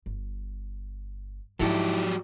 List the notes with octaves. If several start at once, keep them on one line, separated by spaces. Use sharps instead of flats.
G1
G#2 F3 F#3 D#4 E4 G4 A4